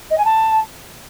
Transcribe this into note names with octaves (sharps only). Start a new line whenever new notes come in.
D#5
G#5
A5